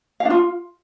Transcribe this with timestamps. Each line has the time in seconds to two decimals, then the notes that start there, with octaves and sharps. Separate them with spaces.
0.20 F5
0.25 D4
0.30 F4